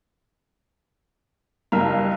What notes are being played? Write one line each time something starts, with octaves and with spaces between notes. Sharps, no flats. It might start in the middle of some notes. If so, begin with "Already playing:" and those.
F#1 G2 A#4 F5 A#5